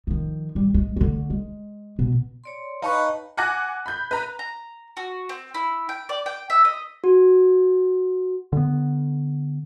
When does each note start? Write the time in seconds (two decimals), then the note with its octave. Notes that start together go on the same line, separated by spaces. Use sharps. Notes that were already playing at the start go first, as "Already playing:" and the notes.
0.07 D#3 F3
0.55 A1 G3
0.74 G#3
0.96 D3 A3
1.30 G#3
1.99 B2
2.44 C#5 D5 C6
2.82 D#4 B4 C#5 F5 G5 A5 C#6
3.37 F#5 G#5 D6 F#6 A#6
3.86 B5 G6
4.11 B4 A#5
4.39 A#5
4.97 F#4
5.29 C4
5.55 E4
5.89 G5
6.09 D5
6.26 G5
6.50 E5
6.65 D#5
7.04 F#4
8.53 D3 B3